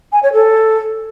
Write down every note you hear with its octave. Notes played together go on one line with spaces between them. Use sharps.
G#5
C#5
A4